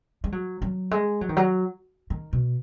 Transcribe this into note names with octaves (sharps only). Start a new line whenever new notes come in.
G#3
F#3
F#3
G#3
F#3
D#3
F#3
D#3
B2